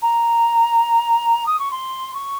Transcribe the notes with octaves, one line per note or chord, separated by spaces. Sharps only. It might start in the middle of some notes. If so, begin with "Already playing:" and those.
A#5
D#6
C#6
C6
C#6